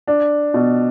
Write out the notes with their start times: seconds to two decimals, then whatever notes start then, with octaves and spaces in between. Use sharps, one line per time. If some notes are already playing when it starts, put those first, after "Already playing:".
0.07 D4
0.54 B2